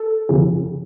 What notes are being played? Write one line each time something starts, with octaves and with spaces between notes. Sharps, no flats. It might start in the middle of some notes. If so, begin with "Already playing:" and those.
Already playing: A4
G1 F2 C#3